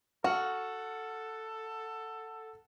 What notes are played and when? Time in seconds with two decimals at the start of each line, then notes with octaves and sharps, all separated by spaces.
0.24 F#4 A4 F#5 F6